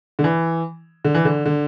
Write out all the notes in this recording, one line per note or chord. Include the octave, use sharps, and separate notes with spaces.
D3
E3
D3
E3
D3
D3